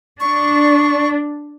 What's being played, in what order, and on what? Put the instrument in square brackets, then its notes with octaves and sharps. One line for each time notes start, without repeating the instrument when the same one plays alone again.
[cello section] D4 [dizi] C#6